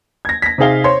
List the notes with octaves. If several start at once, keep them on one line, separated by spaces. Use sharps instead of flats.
G#6 A#6
A#6 B6
C3 C4 D#4 G#4 F5 G7
C5 C#5 C6